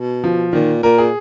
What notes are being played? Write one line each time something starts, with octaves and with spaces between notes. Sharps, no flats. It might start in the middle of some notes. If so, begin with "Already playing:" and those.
Already playing: B2
F3
A#2 D#3
A#2 A#4
G#4